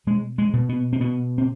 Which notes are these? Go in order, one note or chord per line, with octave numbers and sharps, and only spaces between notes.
B2 G#3
G#3
B2
B3
C4
B2 B3
C4